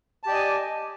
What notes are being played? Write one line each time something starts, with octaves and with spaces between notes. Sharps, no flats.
G4 D5 D#5 G#5 A5